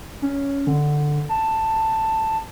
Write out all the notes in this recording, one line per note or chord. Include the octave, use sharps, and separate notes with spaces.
C#4
D3
A5